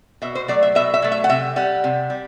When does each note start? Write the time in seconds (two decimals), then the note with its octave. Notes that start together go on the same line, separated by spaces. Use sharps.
0.22 B2 E5
0.35 C5
0.48 F#3 A3 D5
0.63 E5
0.75 B2 E5
0.94 E5
1.02 F#3 A3
1.12 E5
1.24 F#5
1.29 C3 E5
1.56 G3 F#5
1.84 C3
2.10 G3